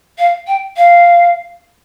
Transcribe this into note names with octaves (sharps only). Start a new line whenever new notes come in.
F5
G5
F5